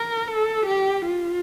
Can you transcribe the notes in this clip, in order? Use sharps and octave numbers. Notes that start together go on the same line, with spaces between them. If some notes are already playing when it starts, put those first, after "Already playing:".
Already playing: A#4
A4
G4
F4